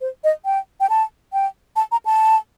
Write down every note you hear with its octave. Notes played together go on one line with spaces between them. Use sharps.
C5
D#5
G5
G5
A5
G5
A5
A#5
A5